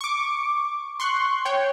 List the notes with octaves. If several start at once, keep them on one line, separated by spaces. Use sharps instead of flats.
C#6 D6
C6 C#6 F#6
C#5 G5